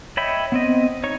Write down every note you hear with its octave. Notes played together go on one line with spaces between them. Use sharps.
C#5 D#5 E5 G5 B5
B3 C4 D#5
D#4 C#5 C#6